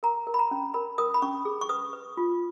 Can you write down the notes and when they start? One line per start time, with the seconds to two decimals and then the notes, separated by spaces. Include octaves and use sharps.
0.03 A#4 A#5
0.27 A#4
0.34 B5
0.39 A#5
0.51 C#4
0.74 A#4 B5
0.98 A#4 D#6
1.14 B5
1.22 C#4 C#6
1.45 G#4
1.61 C#6
1.69 B4 D#6
1.93 B4
2.17 F4